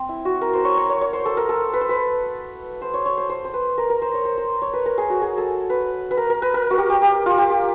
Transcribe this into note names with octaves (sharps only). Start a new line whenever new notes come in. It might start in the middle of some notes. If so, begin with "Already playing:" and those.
Already playing: C4
E4
F#4
A#4
C5
C#5
C#5
C#5
C#5
C5
A4
A#4
A4
B4
C5
B4
C5
C#5
C#5
C5
C5
C5
B4
A#4
A#4
C5
C#5
C5
C5
C#5
B4
A#4
G#4
F#4
G#4
A4
B4
B4
A#4
A#4
B4
A#4
F#4
G4
G4
G4
F4
G4
G4